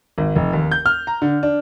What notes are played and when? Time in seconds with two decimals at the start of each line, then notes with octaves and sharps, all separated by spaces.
0.18 G#1
0.36 F1
0.53 D#2
0.72 G6
0.86 F6
1.07 A#5
1.22 D3
1.43 D4